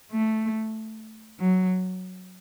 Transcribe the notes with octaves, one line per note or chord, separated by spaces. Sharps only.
A3
F#3